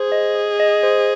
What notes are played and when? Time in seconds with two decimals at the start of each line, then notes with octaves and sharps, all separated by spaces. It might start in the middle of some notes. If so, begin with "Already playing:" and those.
Already playing: G#4 C5
0.12 D#5
0.35 D#5
0.60 D#5
0.83 C5